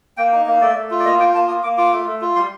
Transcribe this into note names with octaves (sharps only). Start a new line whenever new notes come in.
A#3 G5
D#4
A#3
A3 D5
A3
F4
D5
A#3 D#5
F4 G5
A#3 A5
A#3 D#6
A#3 D6
F4 D6
A3
A3
F4
G3 C6